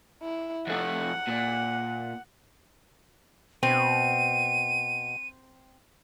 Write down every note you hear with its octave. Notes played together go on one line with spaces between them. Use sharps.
E4
F2 A3 F#5
A#2
B2 C4 D#7